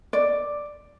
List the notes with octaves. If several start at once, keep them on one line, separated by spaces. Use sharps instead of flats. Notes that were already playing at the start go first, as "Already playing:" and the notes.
D5